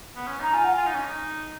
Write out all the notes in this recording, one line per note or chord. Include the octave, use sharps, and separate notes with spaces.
B3
C#4
D#4 A#5
F4 G#5
F#5
F4 G#5
D#4
C#4
D#4